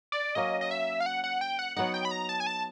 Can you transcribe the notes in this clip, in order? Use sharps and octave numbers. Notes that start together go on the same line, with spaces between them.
D5
F#3 A#3 C#4 D#5
D#5
E5
F5
F#5
F#5
G5
F#5
F#3 B3 D#4 F#5
G5
B5
A#5
A5
G#5
A5